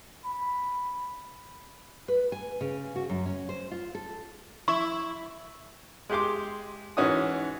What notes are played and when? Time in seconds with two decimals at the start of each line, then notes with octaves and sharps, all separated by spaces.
0.25 B5
2.08 B4
2.32 G#5
2.61 C#3
2.96 F#4
3.10 F#2
3.26 C#4
3.49 C5
3.71 F4
3.95 A4
4.68 E4 C#6
6.09 G#3 G4 C6 D6
6.97 G#2 E3 C#4 F#4 D#6